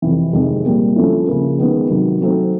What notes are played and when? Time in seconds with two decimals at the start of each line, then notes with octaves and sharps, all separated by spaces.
0.02 F2 C3 E3
0.33 F2 C3 D#3 G#3
0.64 A#2 G3 A#3
0.96 D3 F3 A3 C#4 E4
1.27 C#3 F3 A#3
1.59 D#3 G#3 B3
1.90 C3 D#3 F#3
2.21 F#3 A3 C4 D#4